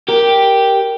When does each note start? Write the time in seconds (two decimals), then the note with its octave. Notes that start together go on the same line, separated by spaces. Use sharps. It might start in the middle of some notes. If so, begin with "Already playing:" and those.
0.08 G4 A#4